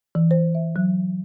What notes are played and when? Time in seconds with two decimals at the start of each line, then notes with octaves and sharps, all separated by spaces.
0.15 E3
0.31 C5
0.55 E5
0.76 F#3